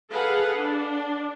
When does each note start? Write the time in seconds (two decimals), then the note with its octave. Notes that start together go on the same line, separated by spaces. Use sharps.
0.11 G#4 A4 B4 F5 F#5
0.55 D4